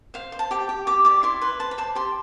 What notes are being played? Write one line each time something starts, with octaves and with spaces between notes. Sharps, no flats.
C5 F5
C5
A5
G4 G5
G4
G4 D6
D5 D6
E4 C6
B4 C6
C5 A5
B5
C5 A5
G4 C6